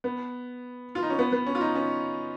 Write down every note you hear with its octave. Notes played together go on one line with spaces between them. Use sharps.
B3
F4
D#4
C#4
B3
B3
C#4
F4
D#4
C#4